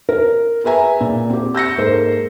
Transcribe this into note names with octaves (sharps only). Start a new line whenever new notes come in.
A#4
G#4 B4 E5 G#5 A#5
A#2
C4 G4
E6 G6 A#6 C#7
G#2 A#3 A4 C5